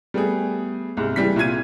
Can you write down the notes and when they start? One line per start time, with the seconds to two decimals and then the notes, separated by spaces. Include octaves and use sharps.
0.14 G3 A3 B3 G#4
0.97 C2 G#2
1.16 C#3 E3 G3 B6
1.36 C2 A#2 F4 G#6 D#7